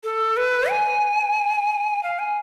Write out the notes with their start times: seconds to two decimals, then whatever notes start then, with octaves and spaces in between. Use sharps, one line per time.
0.04 A4
0.37 B4
0.70 G#5
2.03 F5
2.19 G#5